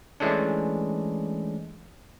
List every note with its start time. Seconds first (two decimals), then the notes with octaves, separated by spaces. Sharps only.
0.20 E3 G#3 A3 C#4 D4